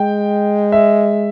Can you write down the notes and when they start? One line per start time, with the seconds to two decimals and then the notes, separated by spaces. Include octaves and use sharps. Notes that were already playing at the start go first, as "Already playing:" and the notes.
Already playing: G#3 G5
0.72 E5